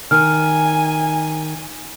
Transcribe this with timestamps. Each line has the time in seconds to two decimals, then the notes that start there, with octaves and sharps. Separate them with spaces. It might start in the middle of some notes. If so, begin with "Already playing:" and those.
0.11 D#3 G#5 F6